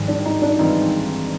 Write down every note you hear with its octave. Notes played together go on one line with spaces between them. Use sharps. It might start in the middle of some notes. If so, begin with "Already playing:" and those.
Already playing: G#2 D#3 G3
D4
D#4
D4
E3 G#3 C4 D#4 F4